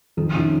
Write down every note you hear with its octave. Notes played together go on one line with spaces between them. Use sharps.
F2 D#3 D#4
C3 D#3 C#4